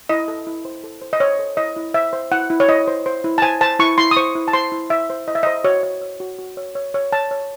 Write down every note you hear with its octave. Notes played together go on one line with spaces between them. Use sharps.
E4 D#5
A4
E4
C5
A4
C5
D#5
C5 C#5
A4
E4 D#5
E4
C5 E5
C5
E4 F#5
E4
C#5
E4 D#5
C5
C5
E4
A5
C5 G#5
C5 A5
E4 C#6
E4 C6
D#6
C5 C#6
E4
A5
C5 C6
E4
E4 E5
C5
E4 D#5
E5
C5 D#5
F#4 C#5
C#5
C#5
F#4
F#4
C#5
C#5
C#5
C#5 A5
C#5